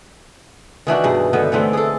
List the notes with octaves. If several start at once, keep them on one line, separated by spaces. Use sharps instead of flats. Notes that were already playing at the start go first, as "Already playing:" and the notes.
D#3 E3 D4 F#4
G2 B2 G#4
D3 D#3 B3 B4
D3 E3 A3 C4
G#4 A4